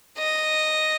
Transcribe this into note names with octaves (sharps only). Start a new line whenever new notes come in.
D#5